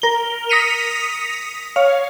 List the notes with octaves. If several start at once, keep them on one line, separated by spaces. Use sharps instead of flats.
A#4 G7
D#6 A#6 B6 C#7 D#7 F7
C#5 F5